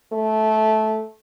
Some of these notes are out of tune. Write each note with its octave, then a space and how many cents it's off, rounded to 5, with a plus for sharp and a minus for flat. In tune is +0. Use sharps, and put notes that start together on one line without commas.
A3 -15